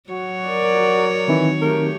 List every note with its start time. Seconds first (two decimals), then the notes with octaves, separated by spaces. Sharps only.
0.10 F#3 F#4 C#5
0.48 A#4 D5
1.28 D#3 E3 C4 D#4
1.61 A3 G4 A#4